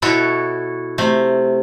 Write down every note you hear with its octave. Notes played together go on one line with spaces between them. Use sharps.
B2 E4 F#4 A4 C#5
C3 A3